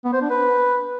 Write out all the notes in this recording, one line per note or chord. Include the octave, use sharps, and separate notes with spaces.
B3
C5
D4
B4